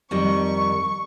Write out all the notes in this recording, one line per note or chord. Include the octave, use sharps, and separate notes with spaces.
F2 D#3 G3 C#6